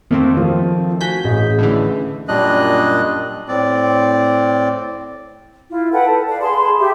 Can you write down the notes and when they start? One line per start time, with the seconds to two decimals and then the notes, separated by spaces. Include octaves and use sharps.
0.11 F2 D#3 A3 A#3 C4
0.37 F3
1.01 F#4 G#5 G6 B6
1.24 A1 G#4 D#5
1.59 A2 D3 E3
2.28 F#2 A#2 G3 D4 D#5 F#6
3.48 A2 C4 D5
5.70 E4 F4
5.92 A4 B4 F#5 G5
6.06 A4 A5
6.28 B4 D5 F5
6.41 G#4 A5 B5 C6
6.79 G4 G#4 E5